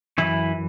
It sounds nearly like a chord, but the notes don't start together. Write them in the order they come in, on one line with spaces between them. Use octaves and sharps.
C#3 E3 E4 F#2